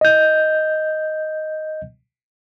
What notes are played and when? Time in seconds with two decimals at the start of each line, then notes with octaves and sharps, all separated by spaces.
0.01 D#5 G6